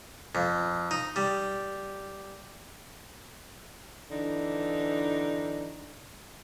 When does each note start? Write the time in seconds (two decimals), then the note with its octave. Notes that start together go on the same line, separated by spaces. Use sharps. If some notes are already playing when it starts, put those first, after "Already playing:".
0.35 F2
0.91 D#4
1.16 G3
4.11 D3 E3 D4 D#4